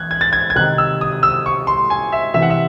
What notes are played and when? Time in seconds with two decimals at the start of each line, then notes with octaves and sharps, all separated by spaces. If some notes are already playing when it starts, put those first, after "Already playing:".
Already playing: E3 F#6 G#6
0.11 G#6
0.21 A6
0.33 G#6
0.50 G#6
0.56 C3 D#3 F#6
0.78 E6
1.01 D#6
1.23 E6
1.46 C#6
1.67 C6
1.90 G#5
2.12 E5
2.34 C3 E3 E5
2.42 F#5
2.50 E5